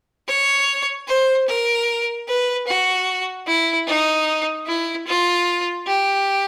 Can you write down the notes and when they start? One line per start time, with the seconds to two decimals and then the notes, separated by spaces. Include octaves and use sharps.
0.28 C#5
1.08 C5
1.48 A#4
2.28 B4
2.67 F#4
3.47 E4
3.88 D#4
4.67 E4
5.07 F4
5.87 G4